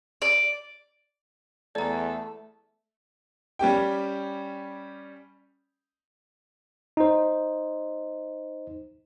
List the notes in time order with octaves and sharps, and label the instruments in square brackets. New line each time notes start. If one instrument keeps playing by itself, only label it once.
[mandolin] D5
[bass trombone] E2 [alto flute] A3 [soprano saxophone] A4 [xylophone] D5 A#5
[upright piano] G3 C#4 G4 G5
[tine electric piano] D#4 C5